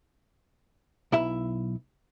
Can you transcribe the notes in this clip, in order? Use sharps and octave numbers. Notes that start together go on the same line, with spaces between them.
B1 E4 E5